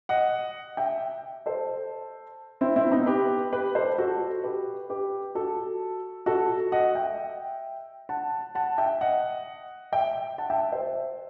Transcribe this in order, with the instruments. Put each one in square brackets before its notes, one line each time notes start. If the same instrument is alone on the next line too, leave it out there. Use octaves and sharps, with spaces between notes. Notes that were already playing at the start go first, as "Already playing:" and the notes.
[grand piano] D#5 F#5
E5 G5
A4 C5
C4 E4
C4 E4
B3 D#4
G4 B4
G4 B4
A4 C5
F#4 A4
G4 B4
G4 B4
F#4 A4
F#4 A4
D#5 F#5
E5 G5
F#5 A5
F#5 A5
E5 G5
D#5 F#5
E5 G5
F#5 A5
E5 G5
C5 E5